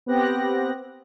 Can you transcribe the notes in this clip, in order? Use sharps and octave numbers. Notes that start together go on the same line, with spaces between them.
B3 C4 G4 F#6 A#6